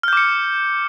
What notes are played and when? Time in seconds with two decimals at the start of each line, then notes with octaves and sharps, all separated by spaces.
0.03 F6
0.08 G6
0.13 D6
0.17 C#7